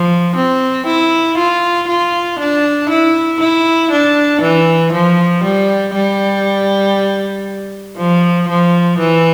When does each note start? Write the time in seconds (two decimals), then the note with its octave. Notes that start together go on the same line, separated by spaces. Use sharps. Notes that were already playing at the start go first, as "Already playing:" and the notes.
Already playing: F3
0.36 C4
0.87 E4
1.37 F4
1.89 F4
2.39 D4
2.90 E4
3.41 E4
3.91 D4
4.42 E3
4.93 F3
5.44 G3
5.95 G3
7.98 F3
8.48 F3
8.99 E3